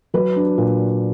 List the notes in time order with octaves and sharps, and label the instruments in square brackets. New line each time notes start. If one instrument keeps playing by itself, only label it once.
[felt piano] F#3 B4
D4
A#2